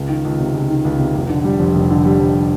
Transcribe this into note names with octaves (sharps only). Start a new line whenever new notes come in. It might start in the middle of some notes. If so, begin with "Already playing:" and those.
Already playing: C#2
D#3
C#2
C3
C#2
D#3
C#2
C3
F1
D3
G3
F2
F1
D3
G3
F2